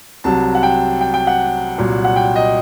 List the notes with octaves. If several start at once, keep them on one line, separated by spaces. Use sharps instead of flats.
C2 C3 F#3 A5
F#5
G5
G5
G5
F#5
C2 A#2 F#3
F#5
G5
D#5